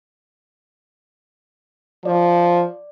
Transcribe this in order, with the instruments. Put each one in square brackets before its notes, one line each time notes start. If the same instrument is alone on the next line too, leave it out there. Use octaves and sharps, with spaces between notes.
[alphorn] F3 [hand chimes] D5